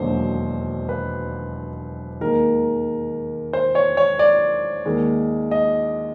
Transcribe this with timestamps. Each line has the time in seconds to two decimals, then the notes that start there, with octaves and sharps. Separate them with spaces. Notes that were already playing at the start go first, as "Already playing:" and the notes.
Already playing: E1 D#2 D3 F#3 C5
0.89 B4
2.21 D#2 D#3 G#3 A#4
3.53 C5
3.75 C#5
3.97 C#5
4.19 D5
4.85 D#2 D#3 G#3
5.51 D#5